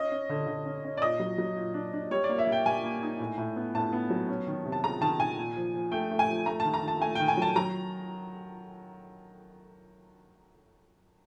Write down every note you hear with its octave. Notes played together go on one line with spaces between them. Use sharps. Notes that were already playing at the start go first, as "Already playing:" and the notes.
Already playing: C#4 D#5
C#4
D3
D3
C#4
C#4
D5
A#2 D#5
F#3
F#3
A#2
D4
D4
G3 C#5
D5
A#3
E5
G3
G5
G3 G#5
A#3
D#4
A2
A2
B3
A2 A5
B3
F#3
C#4
D#3
C3
A5
G#3 A#5
D#3 A5
D#3 G#5
A#2
F3
F3
A3 G5
A3
G#5
F3
A3 A#5
D#3 A5
A#5
D#3
A5
A3 G#5
D#3 G5
G#5
F#3 A5
F#3 A#5